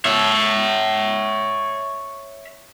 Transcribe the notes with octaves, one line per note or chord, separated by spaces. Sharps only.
C#5 E5